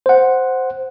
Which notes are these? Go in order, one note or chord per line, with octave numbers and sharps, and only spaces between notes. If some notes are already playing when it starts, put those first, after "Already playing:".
C5 F#5